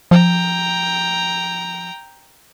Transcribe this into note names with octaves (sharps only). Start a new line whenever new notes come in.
F3 G5 A#5